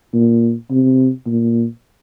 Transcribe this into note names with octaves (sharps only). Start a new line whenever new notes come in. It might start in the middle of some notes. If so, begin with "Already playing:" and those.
A#2
C3
A#2